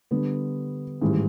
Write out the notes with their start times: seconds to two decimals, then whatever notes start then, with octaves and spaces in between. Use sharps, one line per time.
0.11 D3 G3 B3
1.01 A1 G#2 D#3 G3